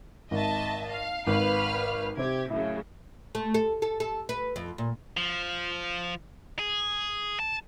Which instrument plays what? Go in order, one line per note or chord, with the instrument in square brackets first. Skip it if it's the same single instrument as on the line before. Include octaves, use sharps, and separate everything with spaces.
[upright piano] G#1 [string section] D#5 E5 A5
[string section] F5
[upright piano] G#1 [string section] B4 F5 F6
[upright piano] C3 C4 [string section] G4 G#6
[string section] F#2 A2 C#3 [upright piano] E4
[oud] A3
A4
A4
A4
B4
F2
A#2
[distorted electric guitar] F3
G#4
A5